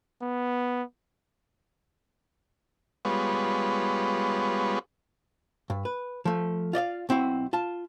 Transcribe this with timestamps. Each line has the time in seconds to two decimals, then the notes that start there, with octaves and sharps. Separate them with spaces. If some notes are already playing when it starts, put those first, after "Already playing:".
0.21 B3
3.05 G3 G#3 B3 F4 B4 C#5
5.70 G2
5.85 B4
6.25 F3 A3
6.73 F4 D5 D#5 F5
7.09 B1 C4 E4 F#4
7.53 F4 A5